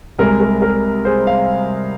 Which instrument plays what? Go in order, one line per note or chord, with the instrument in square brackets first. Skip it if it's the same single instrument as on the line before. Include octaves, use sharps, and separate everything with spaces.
[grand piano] C2 C3 G#3 A#4
A#4
A#4
G#4 C5
C5 F5